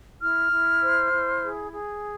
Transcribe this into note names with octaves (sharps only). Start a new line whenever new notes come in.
E4 F6
E4
C5
E4
G#4
G#4